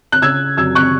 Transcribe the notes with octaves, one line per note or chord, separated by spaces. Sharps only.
F#6
C#3 E6 G#6
F#2 E6 G#6
C#6 F#6